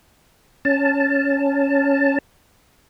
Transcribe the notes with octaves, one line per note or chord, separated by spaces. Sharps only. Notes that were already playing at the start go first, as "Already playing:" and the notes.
C#4 A5